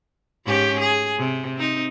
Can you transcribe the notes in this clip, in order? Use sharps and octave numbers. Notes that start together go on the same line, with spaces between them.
G#2 C#4 G4
G#4
C3
C4 D#4